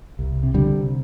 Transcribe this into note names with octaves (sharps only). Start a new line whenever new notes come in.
C2
C3
D3 G3
C3